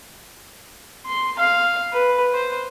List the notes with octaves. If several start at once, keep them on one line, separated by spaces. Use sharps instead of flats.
C6
F5
B4
C5